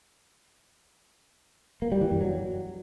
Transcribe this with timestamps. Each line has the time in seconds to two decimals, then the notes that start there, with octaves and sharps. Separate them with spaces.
1.82 A#3
1.92 G3
2.01 E3
2.11 F#2
2.21 F#3